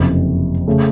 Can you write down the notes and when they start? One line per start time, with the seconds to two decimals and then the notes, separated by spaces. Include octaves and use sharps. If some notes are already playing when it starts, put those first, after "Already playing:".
Already playing: F#1 F2 C3
0.67 C#3 A3